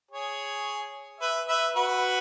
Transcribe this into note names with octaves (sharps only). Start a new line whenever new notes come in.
G#4 C#5
B4 E5
B4 E5
F#4 B4